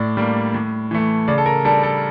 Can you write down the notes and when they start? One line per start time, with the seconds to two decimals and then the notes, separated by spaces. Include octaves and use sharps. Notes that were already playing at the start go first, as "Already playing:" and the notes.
Already playing: A2 D5
0.17 G3 A#3 D4
0.54 A2
0.91 E3 A3
1.28 C#3 D5
1.38 A4
1.46 A#4
1.65 G3 D4 A4
1.83 A4